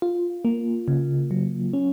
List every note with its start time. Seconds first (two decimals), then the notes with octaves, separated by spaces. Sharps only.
0.02 F4
0.45 A#3
0.88 C#3
1.31 F#3
1.73 C#4